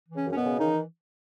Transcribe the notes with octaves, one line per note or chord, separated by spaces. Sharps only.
E3
C#3 C#4
F#2 C#4
B2 B3
C#3
D#3 E3 D#4